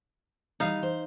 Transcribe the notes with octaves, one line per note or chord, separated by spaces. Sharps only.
E3 G3 D#4 F5
C5